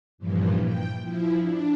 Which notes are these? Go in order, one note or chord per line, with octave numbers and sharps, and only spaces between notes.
G2 A#2 E3 F3
G5
F3 E4
D4